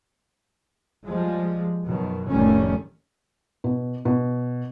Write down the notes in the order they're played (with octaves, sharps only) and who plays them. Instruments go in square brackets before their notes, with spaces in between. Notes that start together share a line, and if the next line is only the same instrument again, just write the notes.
[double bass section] F3 G3 G#3
F#2 B2 D#3
F1 A2 D#3 G3 A3 C#4
[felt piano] B2
B2